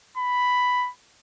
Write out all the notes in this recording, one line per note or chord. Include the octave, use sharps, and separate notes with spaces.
B5